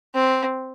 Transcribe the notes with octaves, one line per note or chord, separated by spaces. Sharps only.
C4